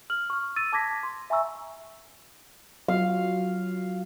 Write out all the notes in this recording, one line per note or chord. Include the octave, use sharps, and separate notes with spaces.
F6 F#7
C#6 F6
E6 A6 D#7
A5 D6 G#6 A#6 B6
C6
E5 G#5 A#5 C#6 E6
F#3 F4 F#4 F5